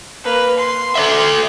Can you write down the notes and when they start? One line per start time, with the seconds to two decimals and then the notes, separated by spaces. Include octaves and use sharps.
0.24 A#3 B4
0.58 C6
0.95 A4 D5 E5